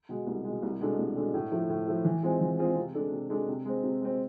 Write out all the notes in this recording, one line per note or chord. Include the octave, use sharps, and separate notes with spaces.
B2 G#3
C2
B2 G#3
C2
B2 G#3 D4 A4
C2
B2 G#3 D4 A4
A2
F3 A3 E4
A2
F3 A3 E4
E3
G#3 C4 F4 G#4
E3
G#3 C4 F4 G#4
C3
G#3 D4 A4
C3
G#3 D4 A4
C3
G#3 C4
C3
G#3 C4